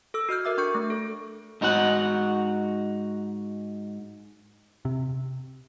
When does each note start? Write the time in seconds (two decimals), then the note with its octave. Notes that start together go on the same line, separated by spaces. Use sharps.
0.14 A4 E6
0.29 F#4 D#5 F6 G6
0.45 A#4 E5 D6
0.58 D4 C#6 G6 C#7
0.75 A3
0.90 A4
1.61 G#2 D#4 F#4 A#4 F#5
4.85 C3